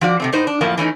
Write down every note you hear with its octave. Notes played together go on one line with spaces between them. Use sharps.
F3 F#4 D5
C3 A3 C4
A2 D#4 C5
D4
F#2 A2 F3 F#3 A#3
E3 A3 C#4 D#4